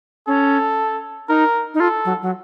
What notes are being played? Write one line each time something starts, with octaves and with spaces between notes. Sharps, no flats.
C#4 A4
D#4 A#4
D#4
F4 A4
F#3
F#3